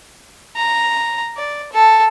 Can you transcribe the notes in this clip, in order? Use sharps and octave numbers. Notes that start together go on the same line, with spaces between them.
A#5
D5
A4